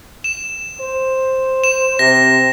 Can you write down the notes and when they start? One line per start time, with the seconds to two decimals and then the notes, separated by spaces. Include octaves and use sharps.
0.24 E7
0.81 C5
1.64 E7
1.99 C3 A#6